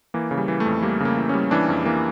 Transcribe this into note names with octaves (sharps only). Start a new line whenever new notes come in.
E3 A#3
C#3
G3
E3
A3
F2
G3 A#3
C#3 A#3
E3
G3 C#4
E3 D4
F2
E3 A#3